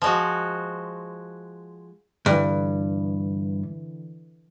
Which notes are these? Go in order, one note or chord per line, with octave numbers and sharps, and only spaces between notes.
F3 G#3 F#4
G2 D3 E3